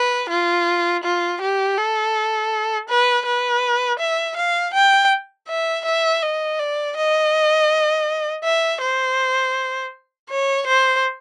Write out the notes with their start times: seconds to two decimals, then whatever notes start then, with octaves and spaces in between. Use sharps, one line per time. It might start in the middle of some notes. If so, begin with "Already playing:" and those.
Already playing: B4
0.30 F4
1.04 F4
1.42 G4
1.78 A4
2.90 B4
3.26 B4
4.00 E5
4.37 F5
4.74 G5
5.48 E5
5.86 E5
6.23 D#5
6.59 D5
6.97 D#5
8.44 E5
8.81 C5
10.30 C#5
10.67 C5